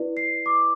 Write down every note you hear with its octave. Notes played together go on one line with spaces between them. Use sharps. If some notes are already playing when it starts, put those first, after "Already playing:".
Already playing: E4 B4 D5
C7
D6